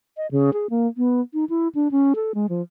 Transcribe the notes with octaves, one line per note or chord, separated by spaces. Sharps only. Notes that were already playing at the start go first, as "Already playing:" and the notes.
D#5
C#3
G#4
A#3
B3
D#4
E4
D4
C#4
A4
G#3
F3